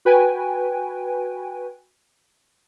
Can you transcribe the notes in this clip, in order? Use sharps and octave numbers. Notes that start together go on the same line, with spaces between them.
F#4 B4 G5 G#5